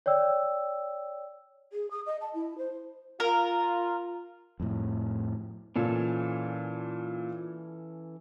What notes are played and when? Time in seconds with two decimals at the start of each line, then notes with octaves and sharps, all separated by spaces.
0.06 C#5 D5 G5 E6
1.71 G#4
1.91 D#6
2.06 D#5
2.21 A5
2.34 E4
2.58 C5
3.20 F4 A#4
4.60 F2 A2
5.76 A#2 E3 C#4 A4